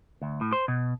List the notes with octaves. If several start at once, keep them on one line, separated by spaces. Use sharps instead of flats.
D2
A2
C5
B2